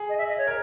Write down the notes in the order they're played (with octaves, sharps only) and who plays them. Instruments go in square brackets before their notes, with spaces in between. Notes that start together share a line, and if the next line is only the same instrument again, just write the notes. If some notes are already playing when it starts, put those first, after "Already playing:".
Already playing: [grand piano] G#4
[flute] D#5
E5
D#5
C#5
[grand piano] A#4